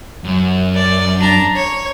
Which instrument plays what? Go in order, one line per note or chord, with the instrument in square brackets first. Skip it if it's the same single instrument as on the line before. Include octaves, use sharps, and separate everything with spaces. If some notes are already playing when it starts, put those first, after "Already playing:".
[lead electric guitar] F#2
[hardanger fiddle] D5
D4 A#5
C#5